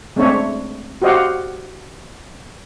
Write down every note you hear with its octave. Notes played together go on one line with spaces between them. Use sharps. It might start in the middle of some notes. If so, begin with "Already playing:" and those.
G#3 A3 C4 D4 C#5 E5
F#4 G4 C5 D#5 F5 F#5